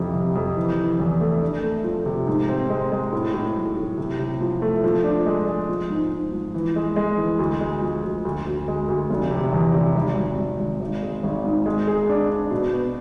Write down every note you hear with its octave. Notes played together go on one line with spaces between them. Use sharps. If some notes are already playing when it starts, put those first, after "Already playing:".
Already playing: F2 C3 E4
C3
F2
E3
E3
E2
A3
D4
A3
F3
C3
G#2
C4
G#3
G#3
A2
A2
B1
A2
C3
C3
F3
A3
F3
D4
G#3
G#3
F3
G#2
G#2
F3
E3
G#3
G#3
E3
D2
G#3
F3
D2
D2
D2
G#3
D2
F1
C3
E2
C3
G#1
G#1
G#1
G#1
G#1
G#3
G#1
G#2
G#3
G#4
D4
D4
B2
B3